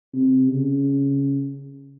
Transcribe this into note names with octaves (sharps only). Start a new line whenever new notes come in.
C3
C#3